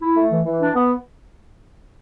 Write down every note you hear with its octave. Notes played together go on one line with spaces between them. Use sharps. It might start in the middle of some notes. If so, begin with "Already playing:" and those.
E4
A3
E3
E3
D4
B3